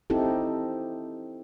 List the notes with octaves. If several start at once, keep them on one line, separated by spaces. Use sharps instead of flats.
C4 D#4 E4 G4 A4